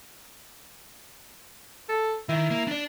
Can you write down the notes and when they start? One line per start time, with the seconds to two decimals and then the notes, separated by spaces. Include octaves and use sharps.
1.89 A4
2.29 D#3 E4
2.50 A#3
2.68 D4 D5